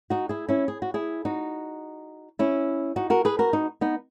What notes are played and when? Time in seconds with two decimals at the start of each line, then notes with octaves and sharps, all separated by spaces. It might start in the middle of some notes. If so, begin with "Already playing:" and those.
0.10 D#4 F#4
0.29 E4 G#4
0.49 C#4 E4
0.68 G#4
0.82 F#4
0.94 E4 G#4
1.25 D#4 F#4
2.39 C#4 E4
2.96 D#4 F#4
3.10 F#4 A#4
3.25 G#4 B4
3.39 F#4 A#4
3.53 D#4 F#4
3.81 B3 D#4